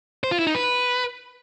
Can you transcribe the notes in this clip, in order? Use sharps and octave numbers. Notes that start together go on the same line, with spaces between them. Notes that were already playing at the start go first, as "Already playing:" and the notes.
C5
F4
E4
D#4
B4